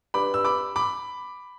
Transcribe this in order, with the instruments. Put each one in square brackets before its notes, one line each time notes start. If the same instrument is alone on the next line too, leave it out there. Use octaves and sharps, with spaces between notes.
[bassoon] G2 [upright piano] B5 D6
[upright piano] E6
B5 D6
B5 D6